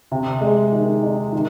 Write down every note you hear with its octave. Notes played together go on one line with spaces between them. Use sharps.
C3
G#3
D#3
D#4
D#3